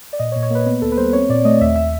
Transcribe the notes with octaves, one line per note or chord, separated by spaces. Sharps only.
D5
A#2 D#5
C#5
A#2
C#5
A#3 B4
B3 B4
D2 A4
B4
G3 C5
C4 C#5
A#2 D5
A3 D#5
D#2 E5
E5